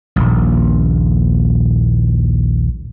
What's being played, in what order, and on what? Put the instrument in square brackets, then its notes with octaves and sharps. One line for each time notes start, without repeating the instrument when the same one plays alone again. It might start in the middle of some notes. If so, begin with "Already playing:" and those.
[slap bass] D#1 A#1